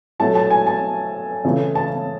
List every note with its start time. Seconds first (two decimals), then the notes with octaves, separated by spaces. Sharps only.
0.19 F#3 A3 E4 A5
0.35 A5
0.50 G#5
0.67 A5
1.45 C#3 E3 A3 E4
1.75 A5